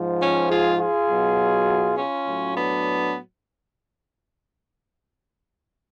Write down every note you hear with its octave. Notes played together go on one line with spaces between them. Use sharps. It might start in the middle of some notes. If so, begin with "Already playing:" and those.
Already playing: G#2 F3
C#4 F4
F4 G#4
F4 G#4
B2 F#3
C#4 F4
A2 F#3
B3 D4